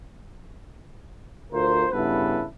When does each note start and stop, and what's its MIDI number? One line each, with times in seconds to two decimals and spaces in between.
1.53 1.87 38
1.53 1.87 65
1.53 1.87 70
1.53 1.87 72
1.92 2.44 43
1.92 2.44 49
1.92 2.44 59
1.92 2.44 64
1.92 2.44 69
1.92 2.44 71